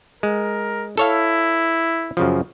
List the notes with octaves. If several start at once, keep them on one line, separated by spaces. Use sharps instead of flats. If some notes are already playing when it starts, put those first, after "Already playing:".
G#3 A#4
E4 A4 C#5 F5
F#2 C#3 F3